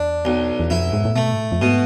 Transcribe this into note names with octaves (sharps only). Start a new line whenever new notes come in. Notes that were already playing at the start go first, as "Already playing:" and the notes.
Already playing: E2 D4
B1
E2
F2 E4
G#2
A2
B2 A3
G#2
A2
F2
G#2 B2